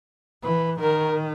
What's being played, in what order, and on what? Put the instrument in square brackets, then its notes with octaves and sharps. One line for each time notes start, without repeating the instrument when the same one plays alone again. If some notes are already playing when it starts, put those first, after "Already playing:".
[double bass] E3 [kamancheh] B4
[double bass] D#3 [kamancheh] A#4